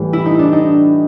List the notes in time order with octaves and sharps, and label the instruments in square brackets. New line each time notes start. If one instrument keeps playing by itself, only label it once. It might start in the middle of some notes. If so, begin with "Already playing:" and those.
Already playing: [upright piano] A2 E3 G3
[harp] E4
D#4
D4
D#4